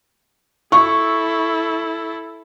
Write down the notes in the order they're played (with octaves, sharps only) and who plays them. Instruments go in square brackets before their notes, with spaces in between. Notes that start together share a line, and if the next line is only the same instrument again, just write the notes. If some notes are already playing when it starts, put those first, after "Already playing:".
[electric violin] E4 A4 [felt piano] C#6